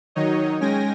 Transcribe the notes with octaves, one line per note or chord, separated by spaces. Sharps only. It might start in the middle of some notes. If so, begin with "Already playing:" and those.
D#3 F#3 D#4 C#5 D#5
G#3 C#4 G5 G#5 A#6